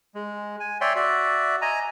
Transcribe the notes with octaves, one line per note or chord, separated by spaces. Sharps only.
G#3
G#5
C#5 D5 E5 G5 C6
F#4 D5 E5
D#5 G#5 A#5